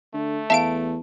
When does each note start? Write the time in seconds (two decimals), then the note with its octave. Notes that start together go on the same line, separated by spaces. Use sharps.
0.14 D3 A3
0.50 E2 E5 F5 A5 D7